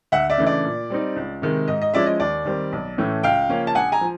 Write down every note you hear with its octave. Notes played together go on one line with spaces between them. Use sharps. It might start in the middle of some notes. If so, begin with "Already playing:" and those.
D2 E5 F#5
D5 E5
C#3 E3 A3 D4
D5
A#2
G3 C4 D#4
C#2
C3 D#3 G#3
G#2 D#5
D#5
F3 G#3 C#4 E4 D5 E5
D#5
D#2 D5
D#3 G3 C4
B1
A2 E3 A3 C#4
C#2 F5 G5
C#3 F3 A#3 C#4
A5
A#1 F#5 G#5
G#5 A#5
F3